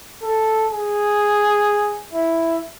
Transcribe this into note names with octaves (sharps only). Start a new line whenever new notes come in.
A4
G#4
E4